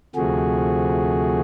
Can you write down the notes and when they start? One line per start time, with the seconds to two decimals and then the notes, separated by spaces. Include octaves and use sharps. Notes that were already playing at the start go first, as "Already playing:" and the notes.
0.15 D2 C3 F3 A3 F#4 G#4